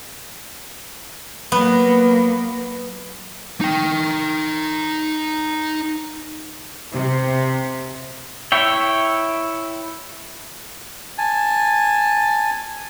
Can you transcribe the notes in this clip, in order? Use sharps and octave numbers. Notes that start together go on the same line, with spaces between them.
F#3 A#3 B3
D#4 G5
C3
E4 C#5 E5 G5
G#5 A5